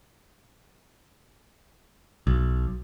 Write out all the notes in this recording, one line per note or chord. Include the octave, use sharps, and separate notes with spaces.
B1